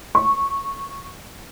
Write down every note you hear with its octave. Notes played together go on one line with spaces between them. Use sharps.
C#6